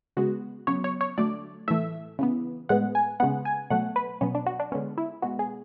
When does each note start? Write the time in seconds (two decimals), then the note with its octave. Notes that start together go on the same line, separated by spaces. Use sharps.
0.17 C#3 G#3 B3 F#4
0.67 C#3 F#3 B3 C#5
0.84 C#5
1.01 C#5
1.18 D3 F#3 A3 D5
1.68 A2 E3 A3 E5
2.19 C#3 E3 B3
2.69 A2 G#3 B3 F#5
2.95 G#5
3.20 C#3 G#3 B3 F#5
3.45 G#5
3.70 B2 F#3 A3 F#5
3.96 B4
4.21 B2 F#3 B3 C#4
4.35 D4
4.46 F#4
4.60 D4
4.72 D3 G#3 B3 C#4
4.98 E4
5.22 B2 G#3 B3 F#4
5.39 G#4